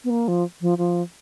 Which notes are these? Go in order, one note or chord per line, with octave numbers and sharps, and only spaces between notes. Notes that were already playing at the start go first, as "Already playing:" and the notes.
B3
A#3
F3
F3
F3